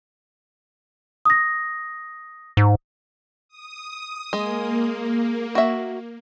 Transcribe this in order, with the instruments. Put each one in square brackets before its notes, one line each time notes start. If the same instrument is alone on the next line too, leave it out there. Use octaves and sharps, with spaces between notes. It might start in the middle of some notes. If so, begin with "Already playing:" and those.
[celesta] D#6 A#6
[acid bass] G#2
[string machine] D#6
[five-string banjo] G#3 [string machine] A#3
[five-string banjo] F#4 E5